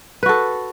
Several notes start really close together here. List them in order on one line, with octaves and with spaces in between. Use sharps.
B4 F#4 A4